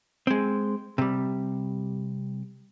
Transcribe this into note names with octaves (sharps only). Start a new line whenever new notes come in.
G#3 C4
C3 G3